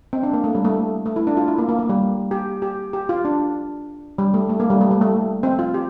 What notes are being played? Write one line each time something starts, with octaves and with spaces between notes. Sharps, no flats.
C4
D4
A#3
A3
G3
A3
A3
E4
D4
F4
E4
A#3
A#3
A#3
G3
G4
G4
G4
F4
D4
G3
A3
A3
A#3
G3
A3
G3
A3
C4
F4
G4